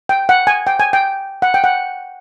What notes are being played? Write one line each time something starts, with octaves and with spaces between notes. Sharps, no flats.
G5
F#5
G#5
G5
G#5
G5
F#5
G5
F#5